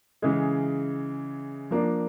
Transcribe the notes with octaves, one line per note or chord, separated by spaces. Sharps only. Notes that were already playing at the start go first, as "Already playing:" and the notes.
C#3 E3 G#3
F3 A#3 D4